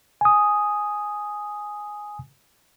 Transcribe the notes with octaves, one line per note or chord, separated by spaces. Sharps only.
G#5 D#6